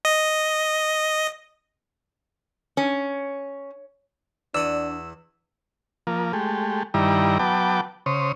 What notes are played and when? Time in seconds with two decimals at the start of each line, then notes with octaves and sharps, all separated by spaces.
0.05 D#5
2.77 C#4
4.55 E2 D4 D5 F#5 D#6 E6
6.07 F3 A#3
6.33 G#3 A3 G4
6.94 G2 D#3 G3 E4 D5 A#5
7.39 F#3 B3 G5 A5 D6
8.06 C#3 C5 C#5 D#6